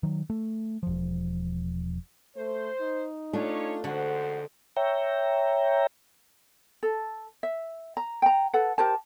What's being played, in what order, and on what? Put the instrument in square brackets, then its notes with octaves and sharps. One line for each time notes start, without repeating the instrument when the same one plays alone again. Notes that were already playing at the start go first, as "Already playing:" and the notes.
[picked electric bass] D#3 F#3
A3
E1 F3
[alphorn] A3 [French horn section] C5
[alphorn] D#4
[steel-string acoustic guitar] A3 D4 F4 [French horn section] C#4 C#5
[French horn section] F2 G#2 C5 [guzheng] D3 [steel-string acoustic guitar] F#4 F#5
[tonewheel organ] C#5 E5 G5 A#5
[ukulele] A4
E5
A#5
G5 A#5
A4 B4 F#5
G4 A#4 C5 A5